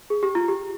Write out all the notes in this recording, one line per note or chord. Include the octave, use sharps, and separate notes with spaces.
G#4
G4
F4
G4